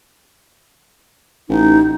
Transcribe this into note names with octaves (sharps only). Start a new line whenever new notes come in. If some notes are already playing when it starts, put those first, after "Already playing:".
A1 D#4